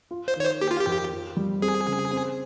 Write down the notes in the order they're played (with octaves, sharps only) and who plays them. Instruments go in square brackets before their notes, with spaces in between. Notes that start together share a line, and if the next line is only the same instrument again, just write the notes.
[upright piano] F4
[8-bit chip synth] C5
[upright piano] D#3 [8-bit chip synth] C#5
[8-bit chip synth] C5
[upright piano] A#3 [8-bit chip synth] G4
[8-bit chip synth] F4
G4
[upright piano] F2
F4
G3
[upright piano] C4 [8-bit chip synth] G#4
[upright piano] C#3
C4